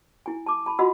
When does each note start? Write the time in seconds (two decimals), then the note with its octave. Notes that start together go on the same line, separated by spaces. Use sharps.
0.26 E4 G#5
0.46 A5 D6
0.66 A5 B5
0.79 F4 F#4 D#5 F#5 B5 E6